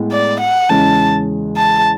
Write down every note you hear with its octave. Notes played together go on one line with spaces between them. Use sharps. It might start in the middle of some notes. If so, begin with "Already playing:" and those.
Already playing: A2 G#3 B3
D5
F#5
E2 C#3 G#3 C#4 A5
A5